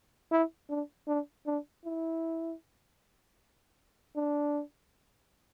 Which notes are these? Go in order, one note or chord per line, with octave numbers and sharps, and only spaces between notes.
E4
D4
D4
D4
E4
D4